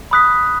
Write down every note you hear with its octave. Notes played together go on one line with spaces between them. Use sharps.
B5 D#6 F#6 B6